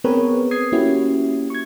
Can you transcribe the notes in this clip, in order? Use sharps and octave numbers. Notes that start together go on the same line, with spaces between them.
B3 C4 G#4 A#4 B4 C#5
D#6 G#6 C7
A#3 C#4 E4 F#4 G4
C#6 G#6